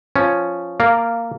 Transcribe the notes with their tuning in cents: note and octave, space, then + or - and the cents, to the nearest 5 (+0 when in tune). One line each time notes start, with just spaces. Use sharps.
F3 +0 C#4 +0
A#3 -10 D5 +0 F5 +0